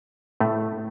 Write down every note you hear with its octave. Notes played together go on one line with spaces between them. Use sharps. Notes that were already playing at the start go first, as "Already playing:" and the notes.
A2 A3